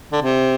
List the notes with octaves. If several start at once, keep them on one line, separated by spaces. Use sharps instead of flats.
D3
C3